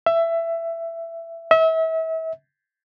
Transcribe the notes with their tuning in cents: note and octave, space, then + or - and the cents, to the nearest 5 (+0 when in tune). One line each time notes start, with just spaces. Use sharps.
E5 +15
E5 -35